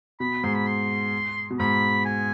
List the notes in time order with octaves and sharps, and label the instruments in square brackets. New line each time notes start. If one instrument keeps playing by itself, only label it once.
[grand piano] B2 [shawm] B5
[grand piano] G#2 [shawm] C6
[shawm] B5
C6
[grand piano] B2
[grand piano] G#2 [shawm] B5
[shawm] G#5